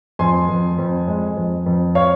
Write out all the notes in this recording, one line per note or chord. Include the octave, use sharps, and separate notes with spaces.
F2 G#5 C6
F2
F2
G#3
F2
F2
C#5 F5